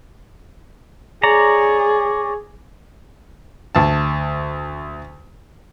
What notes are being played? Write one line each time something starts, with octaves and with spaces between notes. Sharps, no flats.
G#4 C#5 D5 A#5
D2 A5